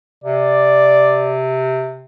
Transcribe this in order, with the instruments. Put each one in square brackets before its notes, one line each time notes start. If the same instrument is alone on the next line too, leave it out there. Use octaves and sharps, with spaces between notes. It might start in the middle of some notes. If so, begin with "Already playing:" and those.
[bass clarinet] C3 [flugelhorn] D5